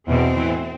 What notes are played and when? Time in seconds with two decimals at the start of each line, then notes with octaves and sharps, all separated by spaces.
0.08 E2 B2 C4
0.37 A2 E3